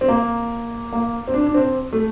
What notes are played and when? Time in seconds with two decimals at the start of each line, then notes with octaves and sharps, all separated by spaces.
0.01 C4
0.08 A#3
0.93 A#3
1.28 C4
1.34 D4
1.47 D4
1.54 C4
1.93 A3